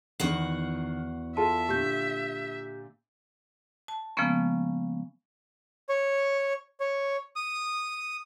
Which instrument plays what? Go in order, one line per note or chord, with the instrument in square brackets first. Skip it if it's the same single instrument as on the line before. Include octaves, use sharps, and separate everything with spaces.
[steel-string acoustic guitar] E2 F#4 F#5 [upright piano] D#3 C7
[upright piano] F4 A4 C6 [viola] E5 [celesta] A5
[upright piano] A#2 D3 [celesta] G4 G6
[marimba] A5
C#3 F3 G#3 A#3 B3 C#4
[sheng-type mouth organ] C#5
C#5
D#6